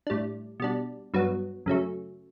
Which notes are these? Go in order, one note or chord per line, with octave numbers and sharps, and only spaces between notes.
A2 G3 D4
B2 G3 D4
G2 F#3 B3
F#2 C#3 F#3 A3